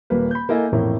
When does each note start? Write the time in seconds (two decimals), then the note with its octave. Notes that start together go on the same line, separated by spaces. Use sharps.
0.10 D#1 G3 A#3 B4
0.31 B5 G6
0.49 A#3 E4 A4 D#5 G#5
0.72 A1 F2 A2 A#3 A#4 E5